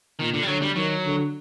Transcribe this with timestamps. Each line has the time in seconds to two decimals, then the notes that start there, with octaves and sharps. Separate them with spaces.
0.19 A#2 D#3
0.34 D3
0.43 G3
0.47 D3 F#3
0.62 G3
0.76 D#3 F#3
1.05 D3